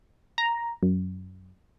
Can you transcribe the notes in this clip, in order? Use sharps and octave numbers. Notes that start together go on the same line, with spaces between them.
A#5
F#2